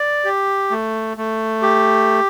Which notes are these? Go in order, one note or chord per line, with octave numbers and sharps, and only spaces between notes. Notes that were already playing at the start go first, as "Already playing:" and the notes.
Already playing: D5
G4
A3
A3
G4